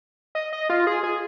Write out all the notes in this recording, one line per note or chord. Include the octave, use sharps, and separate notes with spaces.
D#5
D#5
F4
G#4
G#4